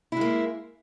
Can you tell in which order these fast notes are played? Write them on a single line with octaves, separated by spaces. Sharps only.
E4 G#3 A#3